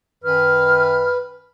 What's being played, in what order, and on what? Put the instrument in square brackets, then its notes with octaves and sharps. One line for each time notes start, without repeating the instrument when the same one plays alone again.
[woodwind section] F#2 D#3 F6 [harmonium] B4